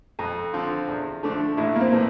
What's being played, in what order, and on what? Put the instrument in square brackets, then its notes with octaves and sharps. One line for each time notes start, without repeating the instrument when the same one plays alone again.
[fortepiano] F2
D3 F3 C4 F4
E2
D3 F3 A3 D4
[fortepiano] A1 [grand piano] E4
[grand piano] A#3
C4
[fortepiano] A2 E3